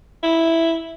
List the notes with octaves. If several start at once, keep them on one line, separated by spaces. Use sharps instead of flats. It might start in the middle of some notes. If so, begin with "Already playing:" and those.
E4